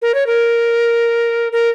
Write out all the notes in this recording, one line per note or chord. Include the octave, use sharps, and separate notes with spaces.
A#4
C#5
A#4
A#4